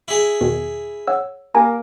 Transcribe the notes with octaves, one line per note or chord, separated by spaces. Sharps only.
E4 G#4
E2 B2 D#3
C#5 F#5 E6
A#3 G4 G#5 A#5